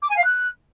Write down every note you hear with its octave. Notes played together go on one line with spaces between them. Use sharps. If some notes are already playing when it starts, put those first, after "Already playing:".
D6
G#5
F5
F#6